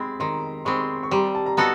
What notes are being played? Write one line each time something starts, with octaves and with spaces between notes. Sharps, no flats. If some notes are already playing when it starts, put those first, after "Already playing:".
Already playing: G#3 C4 B5
D#3 A#5 C6
G#3 C4 B5 C#6
C#6
G3 A#5 C6
A5
A#5
B3 D#4 F#4 A4 A5 B5